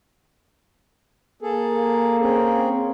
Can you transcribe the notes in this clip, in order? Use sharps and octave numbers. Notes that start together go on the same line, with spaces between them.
A#3 G#4 A4
C4 C#4 G#4